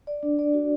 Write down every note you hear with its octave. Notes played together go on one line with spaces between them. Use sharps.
D5
D4
D5
F#4